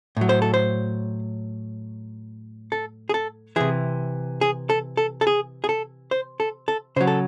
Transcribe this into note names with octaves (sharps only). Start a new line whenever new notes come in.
A2 F#3
C5
A4
C5
A4
G#4
A4
C3 E3 G#4
G#4
A4
A4
A4
G#4
G#4
A4
C5
A4
A4
C#3 F#3 C5
A4